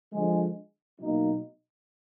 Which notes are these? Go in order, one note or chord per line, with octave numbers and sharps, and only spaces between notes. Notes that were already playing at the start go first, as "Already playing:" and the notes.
D3 F3 G#3
B2 F#3 A#3 D#4